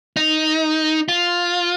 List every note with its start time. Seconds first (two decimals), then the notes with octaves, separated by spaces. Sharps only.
0.17 D#4
1.08 F4